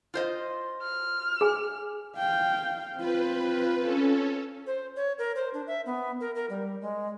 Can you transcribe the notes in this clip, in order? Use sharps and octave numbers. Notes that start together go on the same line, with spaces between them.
F4 C5 D#5
F6
G#4 G#5
F5 G5
C4 F4 B4
C#4 A4
C5
C#5
A#4
C5
D4
E5
B3
A#4
A#4
G3
G#3